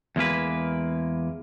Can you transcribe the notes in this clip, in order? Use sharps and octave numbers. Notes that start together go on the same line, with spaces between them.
E2 G#3 A#3 B4